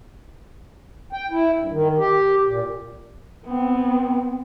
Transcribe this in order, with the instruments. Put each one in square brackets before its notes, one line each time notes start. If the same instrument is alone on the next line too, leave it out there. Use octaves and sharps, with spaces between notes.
[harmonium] G5
E4
G2
D#3
G4
A#2
[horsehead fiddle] B3 C4